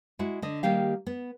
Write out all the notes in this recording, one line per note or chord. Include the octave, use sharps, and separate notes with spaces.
G#3 E4 F#4
D3 D#5
D#3 G3 A#3 G4 F5
B3